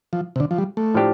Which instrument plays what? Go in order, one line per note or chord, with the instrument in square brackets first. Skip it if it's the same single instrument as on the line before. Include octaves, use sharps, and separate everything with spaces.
[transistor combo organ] F3
C3
D3
F3
G3
A3
[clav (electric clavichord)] A2 F3 D4 G4